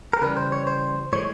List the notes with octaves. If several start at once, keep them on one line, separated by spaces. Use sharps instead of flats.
A#4
C#3 E3 G3 B4
C5
C#5
C5
A2 E3 G#3 C#5